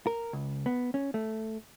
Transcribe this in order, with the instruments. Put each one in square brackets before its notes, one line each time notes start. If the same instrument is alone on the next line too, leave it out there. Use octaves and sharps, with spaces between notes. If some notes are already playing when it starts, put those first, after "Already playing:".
[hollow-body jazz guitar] A#4
C#2
B3
C#4
A3